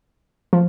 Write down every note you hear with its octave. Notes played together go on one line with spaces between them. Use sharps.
F3